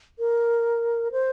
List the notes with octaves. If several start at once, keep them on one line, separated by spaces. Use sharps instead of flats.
A#4
C5